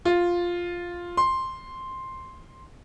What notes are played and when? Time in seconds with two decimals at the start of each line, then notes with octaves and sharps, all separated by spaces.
0.05 F4
1.17 C6